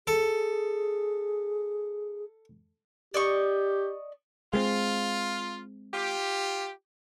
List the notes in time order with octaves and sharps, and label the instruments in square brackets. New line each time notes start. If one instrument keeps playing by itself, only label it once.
[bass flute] G#4 [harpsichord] A4
[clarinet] G4 [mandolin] D5 D#5 C#6
[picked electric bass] G#3 A3 C4 [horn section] F4
[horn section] F4 G4